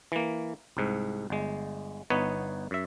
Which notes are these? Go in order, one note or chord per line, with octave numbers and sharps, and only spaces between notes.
E3 A#3
C2 G#2
G1 G#3
G1 B3 D#4 B4 C#5
F#2 E5